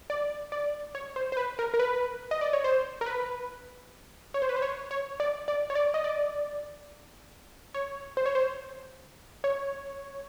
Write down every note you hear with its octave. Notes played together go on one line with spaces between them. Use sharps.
D5
D5
C#5
C5
C5
B4
A#4
A#4
B4
D#5
D5
C#5
C5
A#4
B4
C#5
C5
B4
C5
C#5
C#5
D5
D5
C#5
D5
D#5
D5
C#5
C5
C#5
C5
C#5